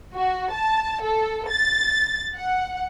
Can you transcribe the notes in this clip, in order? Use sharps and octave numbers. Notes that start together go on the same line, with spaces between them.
F#4
A5
A4
A6
F#5